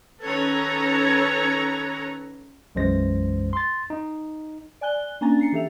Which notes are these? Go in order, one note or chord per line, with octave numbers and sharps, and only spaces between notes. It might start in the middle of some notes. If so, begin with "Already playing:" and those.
D#3 C#4 A4 B4 C#5 A#5
B1 F#2 E3 G#3 C5 A#6
C6 A6
D#4
D5 G#5 F#6 G7
A#3 C#4 D4 G#5 A#5 A6
A#5 C7 C#7
E3 G4 A4 E5 F7